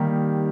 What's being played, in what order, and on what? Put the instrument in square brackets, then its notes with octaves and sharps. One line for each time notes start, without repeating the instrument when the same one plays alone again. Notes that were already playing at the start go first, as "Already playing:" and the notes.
Already playing: [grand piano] D#3 G3 A#3 D#4 G4